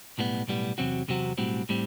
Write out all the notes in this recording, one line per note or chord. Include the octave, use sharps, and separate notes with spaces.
B1 A2 G3 B3
B1 A2 G3 B3
E2 C3 F#3 C4 F#4
E2 C3 F#3 C4 F#4
B1 A2 G3 C4 F#4
A2 G3 C4